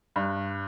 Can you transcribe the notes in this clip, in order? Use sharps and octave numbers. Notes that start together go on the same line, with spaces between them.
G2